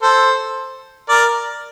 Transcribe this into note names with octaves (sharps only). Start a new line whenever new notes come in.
A4 C5
A#4 D5